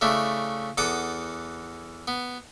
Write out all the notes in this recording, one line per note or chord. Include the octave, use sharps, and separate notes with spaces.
C#3 A3 D4 E4
E2 A4 F#5 D6 D#6
B3